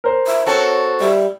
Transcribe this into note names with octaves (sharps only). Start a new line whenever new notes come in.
A#4 C5
E5
C4 F#4 A4 C#5
G3 E5